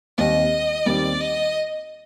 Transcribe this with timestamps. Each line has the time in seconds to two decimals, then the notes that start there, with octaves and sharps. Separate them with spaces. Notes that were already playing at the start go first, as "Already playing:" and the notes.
0.18 D#2 D#3 G3 C4 G4 D#5
0.86 D#2 D#3 G3 C4 G4 D5
1.20 D#5